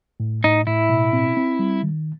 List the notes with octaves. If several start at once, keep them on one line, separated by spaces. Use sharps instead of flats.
A2
A2 D#4
A2 E4
B2
C4
C4
G3
D#3